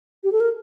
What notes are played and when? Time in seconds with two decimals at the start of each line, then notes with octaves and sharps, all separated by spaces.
0.24 G4
0.32 A4
0.40 A#4